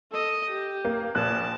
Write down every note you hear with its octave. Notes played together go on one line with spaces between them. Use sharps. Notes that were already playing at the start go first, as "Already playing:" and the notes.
A4 D#5
G4
A#3
A#1 A5 F#6